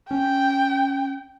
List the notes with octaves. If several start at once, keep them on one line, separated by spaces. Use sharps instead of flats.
C#4 G5